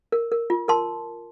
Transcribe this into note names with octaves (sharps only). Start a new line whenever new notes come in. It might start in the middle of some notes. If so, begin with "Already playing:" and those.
A#4
A#4
F4
A#4 A5 C6